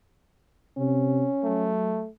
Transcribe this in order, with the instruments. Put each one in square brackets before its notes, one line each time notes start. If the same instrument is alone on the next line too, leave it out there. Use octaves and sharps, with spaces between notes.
[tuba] C3 [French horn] C#4
[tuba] F#3 [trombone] A3